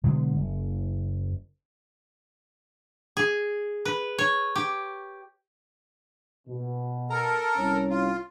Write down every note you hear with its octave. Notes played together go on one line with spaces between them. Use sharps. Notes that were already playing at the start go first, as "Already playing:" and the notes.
B2 D3 F#3 G#3
F#1
G#4
B4
C#5
G4
B2
A4 A#4 A#5
C2 C#4
F4